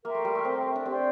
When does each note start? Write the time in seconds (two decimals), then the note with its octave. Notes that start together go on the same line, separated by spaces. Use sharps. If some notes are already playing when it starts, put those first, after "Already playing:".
0.05 A#3 A#4 E5 G5 C6
0.15 A3
0.25 G3
0.35 A3
0.45 C4
0.76 D4
0.85 C4 G4 D5 G5 C6